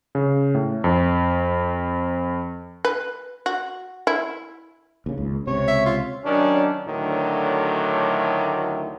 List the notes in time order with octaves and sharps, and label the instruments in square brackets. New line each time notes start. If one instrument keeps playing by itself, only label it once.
[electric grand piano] C#3
A2
F2
[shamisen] B4
F#4
E4
[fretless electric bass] D#2 C#3
C#2
[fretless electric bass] C#2 C3 [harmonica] C#5
[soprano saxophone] E5
F4
[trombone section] D#3 F#3 C#4 D4
D2 A2 D3 D#3 F#3